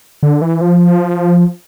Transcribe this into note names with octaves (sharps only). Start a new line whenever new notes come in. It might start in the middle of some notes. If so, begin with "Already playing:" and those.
D3
E3
F3